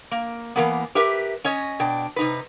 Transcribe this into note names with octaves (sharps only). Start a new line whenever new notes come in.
A#3
E3 A#3 B3
G4 A#4 B4 E5
C#4 C#5 D#5
B2 D4 G5
C3 D#4 B4